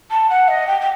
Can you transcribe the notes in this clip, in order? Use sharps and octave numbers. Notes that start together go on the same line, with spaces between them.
A5
F#5
D#5
G5
G5